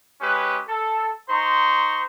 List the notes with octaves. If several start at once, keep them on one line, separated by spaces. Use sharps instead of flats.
G#3 C#4 G4 B4
A4
D#4 C5 A#5 C6 C#6